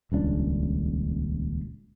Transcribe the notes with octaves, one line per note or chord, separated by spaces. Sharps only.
D#1 C#2 D4